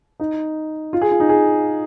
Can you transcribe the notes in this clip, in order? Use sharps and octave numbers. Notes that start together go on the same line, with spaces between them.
D#4
F4
G#4
F4
D#4
G#4